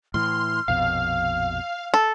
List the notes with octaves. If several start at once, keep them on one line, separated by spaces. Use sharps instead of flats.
A2 E3 C6 F6
A#1 F2 B2 F5
A4